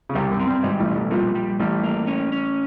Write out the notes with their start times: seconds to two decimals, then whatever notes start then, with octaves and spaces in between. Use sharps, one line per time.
0.09 C#3
0.15 C2 C3 G3
0.31 F#2
0.40 C4
0.47 G2
0.63 G#1 G#2 G3
0.80 A1 A2
0.88 B2
0.95 A1 A2
1.11 A#1 A#2 G3
1.35 G3
1.60 A1 A2 G3
1.83 A#3
2.07 C#4
2.32 C#4